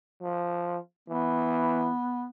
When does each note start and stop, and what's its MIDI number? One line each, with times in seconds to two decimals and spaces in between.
0.22 0.78 53
1.08 1.91 52
1.08 2.26 59